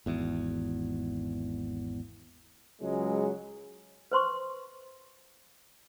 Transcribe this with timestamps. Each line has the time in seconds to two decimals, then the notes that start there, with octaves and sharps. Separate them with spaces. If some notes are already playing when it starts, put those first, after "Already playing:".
0.06 G#1 E2
2.81 C#2 F#3 G#3 G#4
4.11 B4 C5 C6 C#6